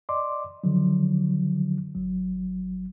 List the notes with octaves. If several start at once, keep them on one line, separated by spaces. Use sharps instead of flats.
D5 D#5 C6 D6
D3 D#3 F3 F#3
G#1 F#3